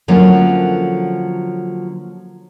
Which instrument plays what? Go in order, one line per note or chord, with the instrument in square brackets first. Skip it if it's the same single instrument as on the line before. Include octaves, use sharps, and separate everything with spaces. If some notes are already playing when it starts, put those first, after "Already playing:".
[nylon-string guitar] D3 F3 F#3 A3 A#3 C#4